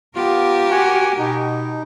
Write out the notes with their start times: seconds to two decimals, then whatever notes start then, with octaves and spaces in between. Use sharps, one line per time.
0.16 B3 F4 G4 A#4
0.71 F#4 F#5 G#5
1.18 B2 D#4